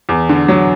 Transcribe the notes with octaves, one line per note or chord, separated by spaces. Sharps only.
E2
D3
F#3